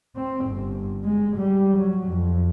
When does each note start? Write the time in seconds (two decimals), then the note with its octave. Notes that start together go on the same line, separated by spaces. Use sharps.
0.16 C4
0.46 G1
1.04 G#3
1.36 G3
1.77 F#3
2.07 F2